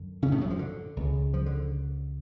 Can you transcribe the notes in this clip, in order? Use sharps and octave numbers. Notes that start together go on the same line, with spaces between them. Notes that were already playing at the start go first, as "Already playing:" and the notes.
Already playing: F#2 D3
C#3 C#4
A2 A3
F#2 F#3
F3
D3
C#2 C#3
F3
D3